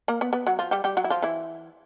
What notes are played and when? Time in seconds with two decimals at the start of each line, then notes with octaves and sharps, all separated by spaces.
0.08 A#3 A#4
0.21 B3 B4
0.33 B3 B4
0.47 F#3 F#4
0.59 F3 F4
0.71 G3 G4
0.84 G3 G4
0.97 F#3 F#4
1.04 E4
1.10 F3 F4
1.22 E3 E4